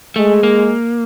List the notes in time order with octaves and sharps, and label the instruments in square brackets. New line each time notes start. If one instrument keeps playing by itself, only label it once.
[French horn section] G#3 [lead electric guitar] A3
[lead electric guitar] A#3